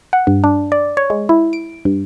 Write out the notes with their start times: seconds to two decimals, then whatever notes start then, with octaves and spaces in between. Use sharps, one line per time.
0.13 F#5
0.27 G2
0.44 D4
0.72 D5
0.97 C#5
1.10 G#3
1.29 E4
1.53 D7
1.85 G2